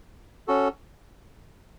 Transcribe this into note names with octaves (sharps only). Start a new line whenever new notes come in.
C#4 F#4 A4